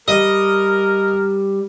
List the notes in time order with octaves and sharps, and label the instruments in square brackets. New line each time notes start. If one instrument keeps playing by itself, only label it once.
[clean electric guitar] G3 [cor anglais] A#4 [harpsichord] D#5